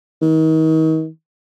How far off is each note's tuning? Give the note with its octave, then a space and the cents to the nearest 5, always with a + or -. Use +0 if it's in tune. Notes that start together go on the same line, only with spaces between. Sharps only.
D#3 +35